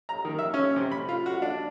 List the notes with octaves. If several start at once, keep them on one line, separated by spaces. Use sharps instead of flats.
A#5
D#3
E5
C#4
C3
B5
F4
F#4
D4